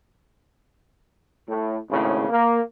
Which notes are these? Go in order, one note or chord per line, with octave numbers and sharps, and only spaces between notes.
A2
G#1 A2 C#3
A#3